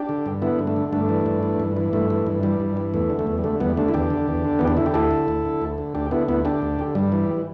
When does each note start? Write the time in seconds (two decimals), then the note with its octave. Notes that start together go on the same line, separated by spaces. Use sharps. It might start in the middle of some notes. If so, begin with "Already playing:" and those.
Already playing: D4 G4
0.09 D3
0.26 G2
0.42 D3 B3 E4
0.59 G2
0.67 A3 D4
0.76 D3
0.93 G2 A3 D4
1.09 E3
1.26 G2
1.43 E3
1.60 G2
1.77 E3
1.93 G2 A3
2.10 E3
2.27 G2
2.43 E3 G3
2.60 G2
2.77 E3
2.94 E2 A3
3.10 D3
3.19 A3
3.27 E2
3.38 G3
3.44 D3 A3
3.60 E2 G3 B3
3.77 D3 A3 D4
3.88 E4
3.94 E2 D4 G4
4.10 D3
4.28 E2
4.45 D3
4.59 E2 B3
4.68 D4
4.77 D3 E4
4.86 G4
4.94 D2 E4 A4
5.11 D3
5.28 D2
5.45 D3
5.62 D2
5.78 D3
5.94 D2 D4 G4
6.11 D3 B3 E4
6.28 D2 B3 E4
6.45 D3 D4 G4
6.62 D2
6.79 D3
6.95 G2 G3
7.12 E3